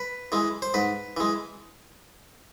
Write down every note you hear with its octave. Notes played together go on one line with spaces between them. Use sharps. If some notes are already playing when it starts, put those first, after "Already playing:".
Already playing: B4
E3 G#3
C5
G#2 B4
E3 G#3